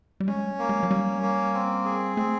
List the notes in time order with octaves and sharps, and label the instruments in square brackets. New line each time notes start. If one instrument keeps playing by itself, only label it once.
[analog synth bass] G3
[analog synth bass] G#3 [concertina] C#4
[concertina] A#3
[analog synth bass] G#3
F#3
[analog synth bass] G3 [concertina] C#4
[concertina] A#3
C4
G#4
[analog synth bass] A3 [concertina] C4